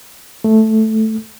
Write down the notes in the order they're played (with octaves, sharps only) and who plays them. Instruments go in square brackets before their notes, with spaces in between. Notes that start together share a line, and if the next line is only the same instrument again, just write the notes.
[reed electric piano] A3